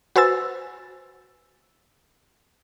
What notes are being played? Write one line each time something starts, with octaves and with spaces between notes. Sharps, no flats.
F#4 B4 C5 G#5 E6 A6